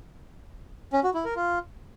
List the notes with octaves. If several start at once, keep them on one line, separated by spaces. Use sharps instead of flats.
C#4
F#4
E4
A#4
F4